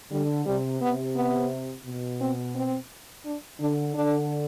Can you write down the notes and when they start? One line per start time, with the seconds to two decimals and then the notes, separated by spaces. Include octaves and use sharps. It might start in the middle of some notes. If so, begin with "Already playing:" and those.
0.11 D3 G3
0.46 C3 G3
0.81 C3 B3
1.16 B3
1.86 B2
2.21 C4
2.55 C4
3.25 D4
3.60 D3 D4
3.94 D3 D4